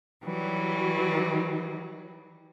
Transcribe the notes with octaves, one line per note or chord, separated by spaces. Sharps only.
E3 F#3 G3